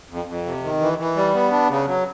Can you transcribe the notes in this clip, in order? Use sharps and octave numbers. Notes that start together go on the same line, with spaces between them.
F2
F2
C3
D#3
E3
E3
G3
B3
D4
C#3
F#3